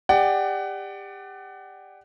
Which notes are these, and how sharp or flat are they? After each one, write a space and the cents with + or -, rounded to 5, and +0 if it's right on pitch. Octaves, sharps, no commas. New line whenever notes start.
G4 +30 D5 +15 F#5 +30